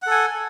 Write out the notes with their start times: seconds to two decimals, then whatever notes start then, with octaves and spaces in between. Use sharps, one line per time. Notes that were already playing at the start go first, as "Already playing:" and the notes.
0.02 F#5
0.07 A4
0.11 G#5